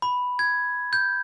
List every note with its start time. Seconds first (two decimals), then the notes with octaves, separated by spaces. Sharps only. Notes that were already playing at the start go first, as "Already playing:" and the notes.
0.02 B5
0.39 G#6
0.93 G6